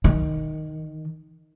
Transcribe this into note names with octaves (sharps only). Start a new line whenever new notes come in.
D#3